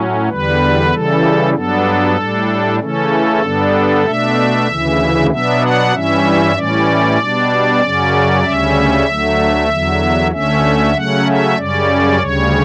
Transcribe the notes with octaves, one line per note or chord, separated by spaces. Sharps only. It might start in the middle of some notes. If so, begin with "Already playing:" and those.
Already playing: A2 F#3 C#4
E2 D3 G3 B4
C#3 E3 G3 A4
G2 F#3 B3 D4 A4
A2 G3 D4
C#3 E3 A3 C#4 A4
G2 D3 G3 B3 D4
B2 A3 D4 E5
D2 C#3 E3
B2 F#3 B3 D4 E5
F#5
G2 E3 G3 C#4 E5
A2 E3 G3 C#4 D5
B2 G3 D4
F#2 C#3 F#3 C#4
D2 C#3 G3 C#4 E5
D2 D3 F#3 A3
E2 D3 F#3
D2 D3 A3 C#4 E5
C#3 F#3 A3 C#4 F#5
E5
F#2 C#3 G3 C#4 D5
D2 C#3 G3 C#5